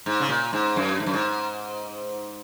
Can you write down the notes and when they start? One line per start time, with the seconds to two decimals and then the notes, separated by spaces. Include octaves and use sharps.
0.06 G#2
0.20 C#3
0.29 A#2
0.53 G#2
0.76 F#2
1.00 G#2
1.06 F#2
1.14 G#2